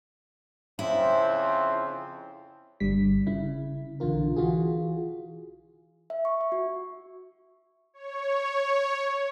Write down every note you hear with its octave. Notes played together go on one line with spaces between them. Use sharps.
F2 C#3 C4 E4
G1 G2 G3 B6
C#3 E4
B1 D3 E3 F4 A#4
E3 F4 F#4 G#4
E5
C#6
E5
F#4
C#5